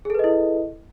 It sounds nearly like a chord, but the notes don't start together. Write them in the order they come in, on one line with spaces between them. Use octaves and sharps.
G#4 A4 B4 D#5 E4